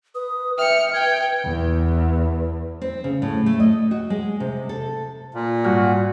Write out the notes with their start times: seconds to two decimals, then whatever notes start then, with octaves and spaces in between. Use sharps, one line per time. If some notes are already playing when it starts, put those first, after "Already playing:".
0.15 B4 D#6
0.58 E5 G5 F6 C#7
0.94 B4 G5 G#6
1.45 E2
2.82 C4
3.04 C#3
3.22 A2
3.46 A3
3.60 D#5
3.91 F#4
4.10 G#3
4.40 C3
4.69 A4
5.34 A#2
5.65 G#2 G3 F#4 F6